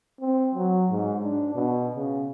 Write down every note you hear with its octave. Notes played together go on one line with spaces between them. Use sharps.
C4
F#3
G#2
D4
B2
C#3